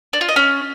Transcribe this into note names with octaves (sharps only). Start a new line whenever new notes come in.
D4
F4
D#5
C#4